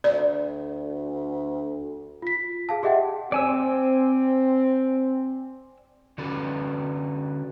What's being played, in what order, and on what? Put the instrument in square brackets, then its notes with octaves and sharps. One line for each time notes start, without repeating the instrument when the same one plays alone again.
[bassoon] D2 [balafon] D5
[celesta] F4 B6
G#4 F5 A5
G4 G#4 D#5 E5 F#5 G5
[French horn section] C4 [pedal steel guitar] D5 G#5 E6
[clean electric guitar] D3 C#4 F#4 A4 B4